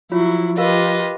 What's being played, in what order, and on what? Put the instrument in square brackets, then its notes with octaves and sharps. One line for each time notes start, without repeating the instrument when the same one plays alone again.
[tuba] F3 [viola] F#3 E4 [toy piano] F4 C#5
[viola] F4 G4 [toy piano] A#4 F5 [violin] B4 D#5